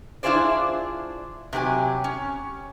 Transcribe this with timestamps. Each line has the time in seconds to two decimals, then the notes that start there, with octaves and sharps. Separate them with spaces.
0.23 D4 E4 F4 G#4 C5 D5
1.53 C3 F#3 G4 B4 G#5
2.04 C#4